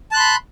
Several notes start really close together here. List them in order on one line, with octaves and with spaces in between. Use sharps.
A5 F#6 C6 B5